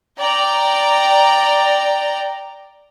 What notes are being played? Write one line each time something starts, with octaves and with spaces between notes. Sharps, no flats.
D5 G5 A#5